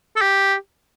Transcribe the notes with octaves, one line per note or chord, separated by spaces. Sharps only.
A4
G4